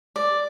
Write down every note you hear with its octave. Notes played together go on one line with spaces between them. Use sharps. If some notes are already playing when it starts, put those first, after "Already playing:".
D5